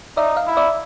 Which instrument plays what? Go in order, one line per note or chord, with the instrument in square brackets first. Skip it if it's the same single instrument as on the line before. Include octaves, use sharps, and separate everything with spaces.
[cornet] D#4 [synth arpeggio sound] D5 E5
[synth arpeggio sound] D#5 F5
[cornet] E4
[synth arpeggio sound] D5 E5